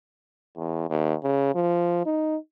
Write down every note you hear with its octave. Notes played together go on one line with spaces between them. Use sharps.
E2
D#2
C#3
F3
D#4